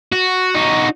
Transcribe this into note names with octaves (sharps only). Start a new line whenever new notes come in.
F#4
D#4 F#4